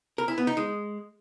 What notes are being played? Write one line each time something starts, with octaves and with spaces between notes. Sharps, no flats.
A#4
E4
B3
D#4
G#3